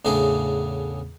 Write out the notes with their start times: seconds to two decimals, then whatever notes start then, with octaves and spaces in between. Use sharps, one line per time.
0.05 E2 A2 C#3 D4 G#4